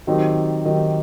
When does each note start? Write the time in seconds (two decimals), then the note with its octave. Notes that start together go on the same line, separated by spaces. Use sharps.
0.07 D#3 F#3 C4 D#4 G4
0.65 D#3 F#3 C4 D#4 G4